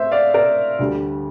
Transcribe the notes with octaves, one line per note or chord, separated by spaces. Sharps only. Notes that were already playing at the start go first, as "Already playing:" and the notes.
Already playing: A2 C5 E5
D5 F5
A#4 D5
D2 D3 G3